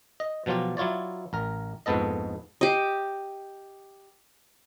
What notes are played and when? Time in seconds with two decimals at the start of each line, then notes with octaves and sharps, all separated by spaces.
0.20 D#5
0.46 B2 F3 F#3 F4 G4
0.77 F#3 E4 F4 C#5 D5
1.33 A1 A#4
1.86 A#1 F2 G#2 B3 A4 D#5
2.61 G4 D#5